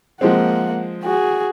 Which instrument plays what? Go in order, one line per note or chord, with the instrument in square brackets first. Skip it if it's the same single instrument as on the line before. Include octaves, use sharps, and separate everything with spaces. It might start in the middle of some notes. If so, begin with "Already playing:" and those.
[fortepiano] F3 G#3 C4 [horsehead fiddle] A#3 F#5
[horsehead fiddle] F#4 G#4